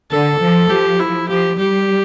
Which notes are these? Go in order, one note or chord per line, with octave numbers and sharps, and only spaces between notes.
D3 A4
F3
F3 G4
E4
F3 G4
G3 G4